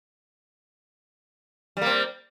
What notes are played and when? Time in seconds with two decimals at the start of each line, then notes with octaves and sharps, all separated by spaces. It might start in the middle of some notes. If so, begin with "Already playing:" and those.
1.77 G3
1.82 A#3
1.86 C4